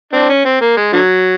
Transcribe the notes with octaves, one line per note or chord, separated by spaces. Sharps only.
C4 D4
C#4
C4
A#3
G#3
D3 F#3